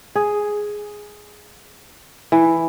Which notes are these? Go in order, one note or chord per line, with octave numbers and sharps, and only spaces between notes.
G#4
E3